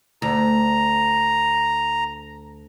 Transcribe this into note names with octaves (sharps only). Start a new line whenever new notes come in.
D2 A#5